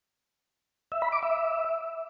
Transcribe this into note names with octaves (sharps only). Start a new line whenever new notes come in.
E5
B5
D6
E5